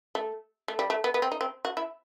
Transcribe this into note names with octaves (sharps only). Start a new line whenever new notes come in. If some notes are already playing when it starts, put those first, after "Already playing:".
A3
A3
G3
A3
B3
B3
C4
D#4
C4
F#4
E4